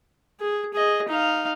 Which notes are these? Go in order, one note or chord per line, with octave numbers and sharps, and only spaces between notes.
G#4
G#4 D#5
D#4 F5